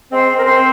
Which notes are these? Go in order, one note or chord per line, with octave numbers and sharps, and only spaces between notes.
G#3 C4 C5
C4 A#4
C4 C5